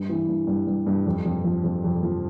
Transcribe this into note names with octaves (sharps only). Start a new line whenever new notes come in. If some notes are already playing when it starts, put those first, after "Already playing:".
Already playing: G2
E3
G2
G2
G2
G2
F2
F2
F3
F2
F2
F3